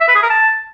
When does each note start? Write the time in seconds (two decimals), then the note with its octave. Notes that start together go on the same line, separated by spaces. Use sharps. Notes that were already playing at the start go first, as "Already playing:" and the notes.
0.01 E5
0.08 B4
0.15 G#4
0.23 A#4
0.30 A5